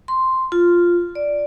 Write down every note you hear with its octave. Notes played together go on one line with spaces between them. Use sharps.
C6
F4
D5